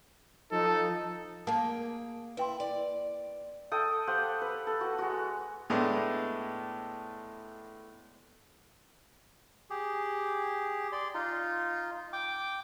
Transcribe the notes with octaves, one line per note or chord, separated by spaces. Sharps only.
F3 D#4 A4
A#3 G#4 G5 A5
E4 B4 G5 C6
D5
A4 G5 D#6
G4 C5 F5 F#5
B4
A4
F#4
G#3 F#4
A2 G#3 A3 B3 D4
G4 G#4
D5 C6
D#4 F4
G5 D6